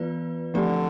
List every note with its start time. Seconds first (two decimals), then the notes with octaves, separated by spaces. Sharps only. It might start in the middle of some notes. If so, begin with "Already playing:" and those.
Already playing: E3 B3 F4 B4 D5
0.54 D3 F3 A3 C4 G4 D5